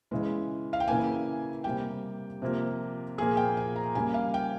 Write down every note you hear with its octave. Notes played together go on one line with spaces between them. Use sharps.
C#3 E3 G#3
F5
G5
C#3 E3 A#3 G#5
C3 G3 A#3 G5
C3 F3 A#3
A#2 F3 A#3 G#4
G5
G#5
A#5
C#3 G3 A#3 G#5
F5
G5